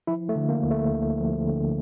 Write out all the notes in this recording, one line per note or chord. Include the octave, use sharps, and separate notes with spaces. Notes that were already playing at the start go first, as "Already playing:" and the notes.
F3 E4
A3
D3
A#3
D2
A3
D2
F3
D3